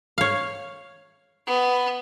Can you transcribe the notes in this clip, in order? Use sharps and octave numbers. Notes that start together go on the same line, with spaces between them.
C#5 F5
B3